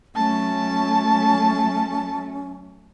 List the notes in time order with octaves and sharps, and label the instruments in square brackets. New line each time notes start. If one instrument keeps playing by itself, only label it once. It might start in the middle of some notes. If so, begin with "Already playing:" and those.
[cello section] F#3 A3 [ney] C#4 [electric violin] A5